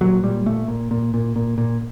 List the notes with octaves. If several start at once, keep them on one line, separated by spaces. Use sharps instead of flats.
A#2 F#3
A#2 G3
A#2 A3
A#2
A#2
A#2
A#2
A#2